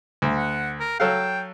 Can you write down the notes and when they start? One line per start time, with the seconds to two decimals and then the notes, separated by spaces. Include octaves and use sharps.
0.22 D2
0.38 F#5
0.80 A#4
1.00 F#3 A4 F5 G5